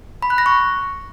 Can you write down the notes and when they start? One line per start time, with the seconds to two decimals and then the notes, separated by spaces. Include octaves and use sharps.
0.22 B5
0.30 F#6
0.38 A#6
0.46 C#6